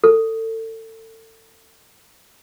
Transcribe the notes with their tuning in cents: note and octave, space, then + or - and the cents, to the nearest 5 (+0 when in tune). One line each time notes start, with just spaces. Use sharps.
A4 +30